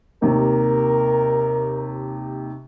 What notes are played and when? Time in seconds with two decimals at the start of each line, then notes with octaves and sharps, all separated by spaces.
0.22 D#2 C3 A#4